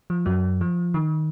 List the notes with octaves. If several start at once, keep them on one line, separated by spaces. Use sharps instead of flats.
F3
F#2 F#3
F3
D#3